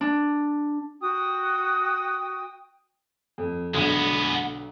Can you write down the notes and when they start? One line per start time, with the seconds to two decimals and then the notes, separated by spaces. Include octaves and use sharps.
0.01 D4
1.01 F#4 G5 D#6
3.38 F2
3.74 B1 D3 G#3 B3